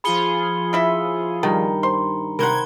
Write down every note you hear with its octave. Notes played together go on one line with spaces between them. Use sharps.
F3 F4 G#4 B5 C#7 G7
C#3 E4 E5
G2 D#3 A#5
C5 C6
C3 A#4 C5 F#5 B5 G#6 G7